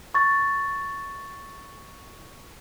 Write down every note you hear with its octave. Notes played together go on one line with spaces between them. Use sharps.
C#6 A6